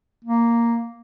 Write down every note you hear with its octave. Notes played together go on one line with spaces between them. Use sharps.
A#3